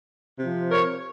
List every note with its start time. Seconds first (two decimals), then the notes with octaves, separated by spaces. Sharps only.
0.39 C3 F3
0.71 A#4 C#5